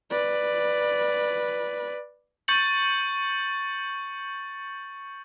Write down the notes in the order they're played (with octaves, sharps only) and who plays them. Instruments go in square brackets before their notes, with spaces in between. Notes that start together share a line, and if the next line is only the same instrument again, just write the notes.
[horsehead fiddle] B4 D5
[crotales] C#6 G6 A6 C#7 F#7